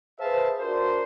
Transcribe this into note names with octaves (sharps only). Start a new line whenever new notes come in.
G#4 B4 C5 E5 F5 A5
D4 F#4 A#4 C5